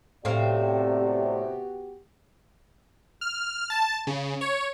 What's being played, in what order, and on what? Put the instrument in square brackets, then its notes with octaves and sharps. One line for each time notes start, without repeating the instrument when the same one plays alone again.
[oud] A2 C4 F5 [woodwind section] C3 [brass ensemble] B3 F#4 G4 [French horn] D5
[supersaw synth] F6
A5
C#3
C#5